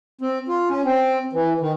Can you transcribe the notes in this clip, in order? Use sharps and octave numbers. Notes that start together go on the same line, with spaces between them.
C4
F4
C#4
C4
E3
D#3